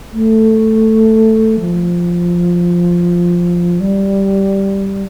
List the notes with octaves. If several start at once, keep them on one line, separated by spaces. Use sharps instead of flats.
A3
F3
G3